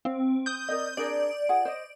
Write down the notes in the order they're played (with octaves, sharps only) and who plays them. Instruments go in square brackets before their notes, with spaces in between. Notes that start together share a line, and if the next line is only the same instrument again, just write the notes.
[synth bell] C4 [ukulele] F5
[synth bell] D#6 G6
[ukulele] A#4 D5 D#5
[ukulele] D4 G#4 A#4 [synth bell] D5 D7
[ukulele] F4 G#4 F#5
C5 D#5